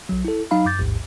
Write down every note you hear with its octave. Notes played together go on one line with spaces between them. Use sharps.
B1 F#3
E4 A4
F#3 D#4 F5 B5
F#2 D6 G6 A6
A1 D#2 G#2